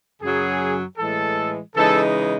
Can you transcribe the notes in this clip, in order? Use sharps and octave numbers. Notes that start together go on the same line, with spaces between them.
F#2 C#3 F#3 G#4
A2 E3 G#3 A4
C#3 E3 G#3 D#4 A4